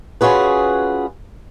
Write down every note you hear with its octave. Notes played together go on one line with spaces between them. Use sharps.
C#4 F4 F#4 G#4 B4